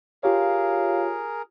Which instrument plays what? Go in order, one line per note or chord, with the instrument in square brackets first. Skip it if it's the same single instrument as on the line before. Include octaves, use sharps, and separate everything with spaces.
[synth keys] F4 G4 C#5 [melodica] G#4 A#4 [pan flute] F5